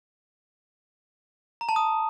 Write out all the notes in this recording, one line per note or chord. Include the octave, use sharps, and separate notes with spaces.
A#5
A5
D#6